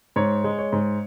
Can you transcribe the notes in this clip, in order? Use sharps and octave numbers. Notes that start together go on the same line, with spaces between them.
G#2 C#5
G#3
C#5
G#2